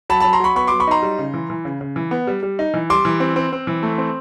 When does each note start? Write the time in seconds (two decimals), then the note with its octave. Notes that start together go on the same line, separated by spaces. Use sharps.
0.10 F#3 A5 B5
0.20 F#3 A5 B5
0.33 A#5 C6
0.40 F#3 B5 C#6
0.55 B3 B5 C#6
0.67 F#3 C6 D6
0.80 B5 C#6
0.87 D#4 A#5 C6
1.02 G3
1.19 C#3
1.34 E3
1.50 E3
1.65 C#3
1.81 C#3
1.96 E3
2.11 B3
2.27 G3
2.43 G3
2.59 D#4
2.74 E3
2.90 G3 C6 D6
3.05 E3
3.20 C4
3.36 C4
3.53 C4
3.67 E3
3.83 A3
3.98 C4